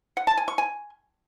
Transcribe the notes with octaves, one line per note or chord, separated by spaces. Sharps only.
F#5
A5
G#5
C#6
G#5